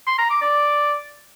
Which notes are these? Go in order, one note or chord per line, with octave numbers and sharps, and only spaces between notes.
C6
A#5
D6
D5